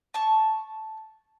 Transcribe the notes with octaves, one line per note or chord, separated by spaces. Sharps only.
A5 C#6